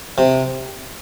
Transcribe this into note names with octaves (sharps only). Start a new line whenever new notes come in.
C3